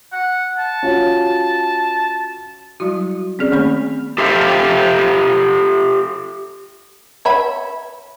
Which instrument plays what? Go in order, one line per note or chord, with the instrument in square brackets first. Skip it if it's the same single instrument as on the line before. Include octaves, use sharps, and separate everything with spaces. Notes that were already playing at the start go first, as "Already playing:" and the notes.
[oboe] F#5
A5
[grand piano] C#4 F4 F#4
[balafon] F#3 G3 E4 F#4
C4 C#4 G#4 D5
D#3 A3 A#3 C#4 B5
[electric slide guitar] G4 A4 C5 E5 F5
[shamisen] C#5 E5 B5